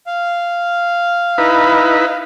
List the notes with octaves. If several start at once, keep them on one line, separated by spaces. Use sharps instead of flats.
F5
D#4 E4 B4